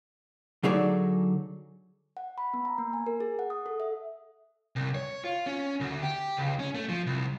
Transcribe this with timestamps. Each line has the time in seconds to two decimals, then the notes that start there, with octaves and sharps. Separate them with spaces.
0.63 D3 F#3 D#4 G#4 A4 D5
2.17 F#5
2.38 B5
2.54 B3
2.65 A#5
2.78 A#3
2.93 G#5
3.06 A#4
3.20 G#4
3.39 F#5
3.50 D#6
3.66 A4
3.80 E5
4.76 C2
4.95 C#5
5.24 F4
5.46 C#4
5.81 D2
6.03 G4
6.37 C#2
6.59 C#4
6.75 A3
6.89 F3
7.07 C2